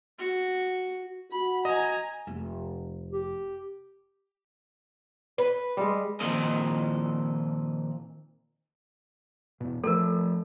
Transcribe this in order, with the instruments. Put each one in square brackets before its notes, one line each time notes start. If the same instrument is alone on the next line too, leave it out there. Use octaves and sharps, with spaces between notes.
[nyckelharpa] F#4
[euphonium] F#4 [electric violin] B5
[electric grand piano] D#5 [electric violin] G#5 A#5
[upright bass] F1
[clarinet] G4
[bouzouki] B4
[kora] G3 G#3
[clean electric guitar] A#2 D#3 F3 C4 D#5
[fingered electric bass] E2 B2
[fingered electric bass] F3 A3 [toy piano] A4 A#4